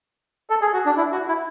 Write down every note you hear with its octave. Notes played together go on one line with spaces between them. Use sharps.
A4
G#4
F#4
D4
E4
F#4
E4